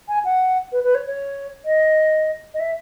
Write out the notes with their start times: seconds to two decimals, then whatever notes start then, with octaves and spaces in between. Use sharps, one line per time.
0.08 G#5
0.25 F#5
0.72 B4
0.84 B4
0.95 C#5
1.06 C#5
1.65 D#5
2.54 D#5
2.60 E5